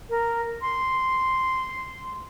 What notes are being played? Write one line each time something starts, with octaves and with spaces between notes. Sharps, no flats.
A#4
C6